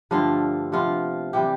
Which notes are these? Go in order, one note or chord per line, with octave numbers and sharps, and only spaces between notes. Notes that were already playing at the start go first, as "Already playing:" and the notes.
G2 D3 F3 A3 F4
C3 F3 B3 F4
C3 E3 G3 G4